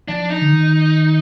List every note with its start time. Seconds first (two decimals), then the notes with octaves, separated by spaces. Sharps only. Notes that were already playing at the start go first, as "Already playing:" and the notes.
0.08 F3 D4
0.29 D#4
0.42 D3
0.51 D#3